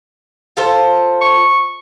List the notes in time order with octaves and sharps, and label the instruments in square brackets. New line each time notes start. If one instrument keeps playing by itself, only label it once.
[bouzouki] F4 A4 C5
[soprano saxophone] C#6